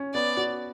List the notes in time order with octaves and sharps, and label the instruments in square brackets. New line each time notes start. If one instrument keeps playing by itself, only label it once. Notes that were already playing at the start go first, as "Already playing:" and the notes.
Already playing: [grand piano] C#4
[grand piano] B3 [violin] D5
[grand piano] F#4